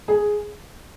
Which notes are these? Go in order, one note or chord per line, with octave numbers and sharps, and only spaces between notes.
G#4